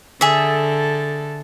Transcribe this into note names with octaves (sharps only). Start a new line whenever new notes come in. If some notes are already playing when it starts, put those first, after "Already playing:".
D3 G#4 A4 E5